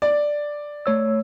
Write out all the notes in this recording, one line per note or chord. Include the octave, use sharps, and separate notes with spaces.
D5
A3 C#5 E6